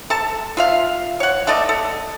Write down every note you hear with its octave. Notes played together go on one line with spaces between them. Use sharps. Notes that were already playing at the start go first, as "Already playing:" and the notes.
A4 A5
F4 E5 F5
C#5 F#5
A3 A4 D5 D#5
A4